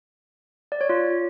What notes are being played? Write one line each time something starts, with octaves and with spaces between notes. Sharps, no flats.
D5
C#5
F4